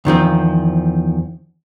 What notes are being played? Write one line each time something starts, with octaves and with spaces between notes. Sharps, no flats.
E2 D#3 F3 C4